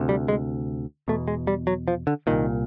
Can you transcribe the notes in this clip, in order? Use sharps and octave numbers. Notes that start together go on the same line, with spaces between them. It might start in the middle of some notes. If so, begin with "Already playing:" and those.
Already playing: D2 C3
G3
G#3
E2 B2 A3
G#3
G3
F#3
F3
D3
C2 A#2 D#3